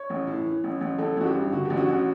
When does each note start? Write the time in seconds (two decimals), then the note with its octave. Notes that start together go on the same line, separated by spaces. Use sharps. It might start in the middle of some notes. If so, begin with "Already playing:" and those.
Already playing: C#5
0.10 A1
0.27 A2
0.46 E3
0.64 A1
0.81 A1
0.98 A1 A4
1.17 A1 F#4
1.26 G4
1.35 G2
1.53 D3 F#4
1.65 G4
1.70 A1
1.77 F#4
1.89 A1